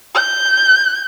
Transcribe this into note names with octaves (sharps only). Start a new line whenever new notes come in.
G6